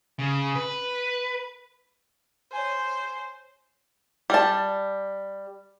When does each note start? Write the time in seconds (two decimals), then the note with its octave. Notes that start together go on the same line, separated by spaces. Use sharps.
0.19 C#3
0.55 B4
2.53 C5 C#5 G#5
4.30 G3 A5